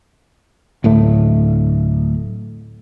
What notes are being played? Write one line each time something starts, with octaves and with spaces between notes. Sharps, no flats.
D1 A2 A3